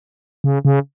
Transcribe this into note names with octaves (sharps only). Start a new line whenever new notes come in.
C#3
C#3